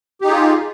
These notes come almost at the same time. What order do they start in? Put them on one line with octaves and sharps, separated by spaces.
G4 D#4 G#4 F4